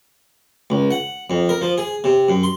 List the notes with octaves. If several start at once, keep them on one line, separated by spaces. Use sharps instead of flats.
C#2
F#5
F2
A#4
F3
G#4
C3
F#2
C6